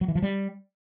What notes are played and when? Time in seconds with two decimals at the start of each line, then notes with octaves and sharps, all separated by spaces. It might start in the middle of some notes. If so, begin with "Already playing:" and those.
0.01 F#3
0.08 E3
0.15 F3
0.22 G3